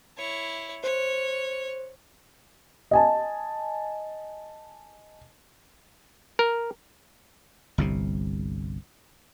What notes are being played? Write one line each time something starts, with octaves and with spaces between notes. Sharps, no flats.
E4 C#5
C5 C#5
D#5 G#5 A5
A#4
G1 C2 C3